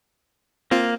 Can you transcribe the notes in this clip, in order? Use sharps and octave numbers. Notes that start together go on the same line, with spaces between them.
A#3 C4 F4